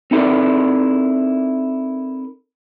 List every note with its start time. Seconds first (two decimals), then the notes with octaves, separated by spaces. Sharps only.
0.11 C4 D#4 E4 A4 A#4 D5